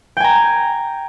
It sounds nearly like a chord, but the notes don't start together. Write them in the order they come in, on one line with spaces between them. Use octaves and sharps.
G5 G#5 A#5